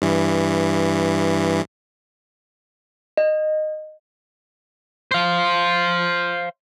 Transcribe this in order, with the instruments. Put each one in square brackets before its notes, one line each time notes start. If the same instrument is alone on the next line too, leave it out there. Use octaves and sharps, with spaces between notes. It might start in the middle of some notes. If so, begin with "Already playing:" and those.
[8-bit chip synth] G2 E3
[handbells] D#5
[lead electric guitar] C5 F5